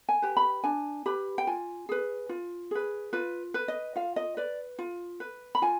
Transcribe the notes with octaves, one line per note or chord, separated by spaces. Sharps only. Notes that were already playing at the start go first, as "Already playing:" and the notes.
G#5
G4 B4
B5
D4 G#5
G4 B4 B5
G5
F4 G#5
G#4 B4
F4
G#4 B4
F4 B4
B4
D#5
F4 F5
D#5
B4 D5
F4
B4
B5
F4 G#5